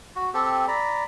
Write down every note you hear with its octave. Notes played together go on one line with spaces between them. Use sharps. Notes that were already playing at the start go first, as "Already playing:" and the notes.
F#4
C4 G4 A4
D5 A#5 B5